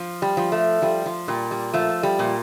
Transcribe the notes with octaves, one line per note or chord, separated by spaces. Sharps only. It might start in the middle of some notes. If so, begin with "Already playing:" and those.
Already playing: F3
G3
F3
A3
F3 G3
F3
A#2 G3
G3
F3 A3
G3
A#2